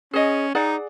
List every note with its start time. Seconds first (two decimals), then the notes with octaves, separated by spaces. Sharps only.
0.14 C#4 G#4 D#5
0.55 D#4 G#4 D5 F#5